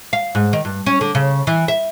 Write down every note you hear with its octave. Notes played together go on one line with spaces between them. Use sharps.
F5
G#2
D#3
G2
C#4
D3
C#3
E3
E5